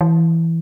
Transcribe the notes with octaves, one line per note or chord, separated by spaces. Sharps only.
E3